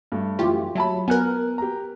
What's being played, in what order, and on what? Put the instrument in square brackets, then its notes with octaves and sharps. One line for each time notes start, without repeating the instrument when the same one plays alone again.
[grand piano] G2 A3
[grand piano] F#2 E3 [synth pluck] A3 F4 G4
[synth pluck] F#3 [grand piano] E5 A5 B5
[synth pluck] B3 A#4 [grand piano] G#5 F#6
[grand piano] G4 A#5